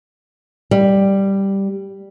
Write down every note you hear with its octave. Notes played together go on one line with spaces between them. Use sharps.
G3